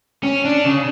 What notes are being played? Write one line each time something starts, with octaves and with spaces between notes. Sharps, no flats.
C#4
D4
C#3